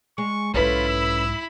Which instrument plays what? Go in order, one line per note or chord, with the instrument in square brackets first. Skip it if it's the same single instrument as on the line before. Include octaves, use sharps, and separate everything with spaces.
[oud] G#3 [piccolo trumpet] C#6
[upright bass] B1 G#2 [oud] C#4 A4 B4 [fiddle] E4 B5 [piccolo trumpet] F4
[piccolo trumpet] E6